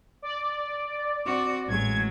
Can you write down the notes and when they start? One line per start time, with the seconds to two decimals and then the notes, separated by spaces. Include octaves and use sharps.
0.22 D5
1.26 C4 F#4
1.68 A1 F#3 G#3 G#6